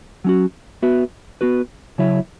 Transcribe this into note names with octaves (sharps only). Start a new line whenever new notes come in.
F#3 C#4 F#4
B3 F#4 B4 E5
B3 F#4 B4
C#3 F#3 E4 C#5 E5